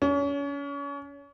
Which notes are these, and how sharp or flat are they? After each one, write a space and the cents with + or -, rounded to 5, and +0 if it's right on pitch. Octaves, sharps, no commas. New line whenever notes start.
C#4 +35